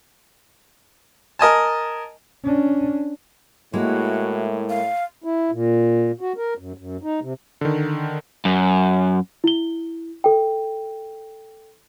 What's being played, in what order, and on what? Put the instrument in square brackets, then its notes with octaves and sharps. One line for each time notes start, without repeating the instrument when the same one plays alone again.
[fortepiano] A#4 D#5 G#5 A5
[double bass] C#4 D4
[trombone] A2 [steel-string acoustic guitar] G#3 A#3 E4 [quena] F#4
[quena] F5
[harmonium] E4
A#2
F#4
A#4
F#2
F#2
D#4
C3
[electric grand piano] D3 D#3
[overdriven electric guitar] F#2
[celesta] E4 G7
A4 G5